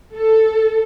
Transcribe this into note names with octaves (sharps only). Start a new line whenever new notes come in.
A4